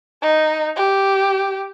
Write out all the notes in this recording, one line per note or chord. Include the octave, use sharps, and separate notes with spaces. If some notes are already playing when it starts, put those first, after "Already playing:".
D#4
G4